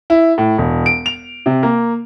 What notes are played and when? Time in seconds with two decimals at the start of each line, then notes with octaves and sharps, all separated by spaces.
0.10 E4
0.38 A2
0.58 E1
0.86 D7
1.06 F7
1.46 C3
1.63 A#3